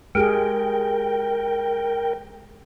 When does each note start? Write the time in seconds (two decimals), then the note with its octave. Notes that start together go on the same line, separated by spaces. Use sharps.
0.15 G#3 G4 G#4 A#4 G5